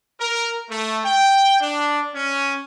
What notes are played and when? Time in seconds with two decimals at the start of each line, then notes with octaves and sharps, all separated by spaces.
0.20 A#4
0.70 A3
1.04 G5
1.61 D4
2.14 C#4